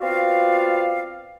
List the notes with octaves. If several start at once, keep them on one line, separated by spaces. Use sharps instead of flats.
B3 C4 F4 F#4 D5 F5